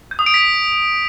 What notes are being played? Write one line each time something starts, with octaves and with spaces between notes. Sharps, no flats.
G6
D#6
D7
B6